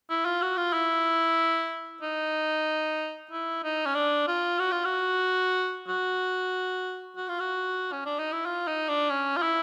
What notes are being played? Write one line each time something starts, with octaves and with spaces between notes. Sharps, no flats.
E4
F4
F#4
F4
E4
D#4
E4
D#4
C#4
D4
F4
F#4
F4
F#4
F#4
F#4
F4
F#4
C#4
D4
D#4
E4
F4
D#4
D4
C#4
F4
E4